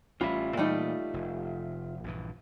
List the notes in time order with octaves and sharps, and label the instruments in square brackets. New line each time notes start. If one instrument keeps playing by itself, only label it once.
[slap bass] A1 C#4 [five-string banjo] G3 [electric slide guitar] F4 E5
[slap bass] A#2 E3 [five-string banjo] G3 A3 D#4
[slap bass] F1
A#1 G2 E3